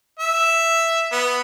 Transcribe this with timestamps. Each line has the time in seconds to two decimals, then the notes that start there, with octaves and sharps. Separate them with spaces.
0.19 E5
1.12 B3